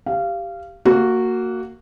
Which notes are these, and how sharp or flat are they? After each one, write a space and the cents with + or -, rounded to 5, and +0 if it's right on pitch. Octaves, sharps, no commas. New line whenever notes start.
G4 +0 F5 -20
A#3 -20 F#4 -5